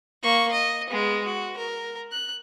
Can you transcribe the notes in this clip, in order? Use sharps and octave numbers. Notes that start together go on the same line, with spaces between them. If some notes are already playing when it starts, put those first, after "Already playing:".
A#3 C#6
D#5
G#3 B3
F#4
A#4
F#6